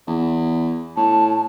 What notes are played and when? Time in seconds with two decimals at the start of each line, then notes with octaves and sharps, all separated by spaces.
0.07 E2
0.97 A2 A5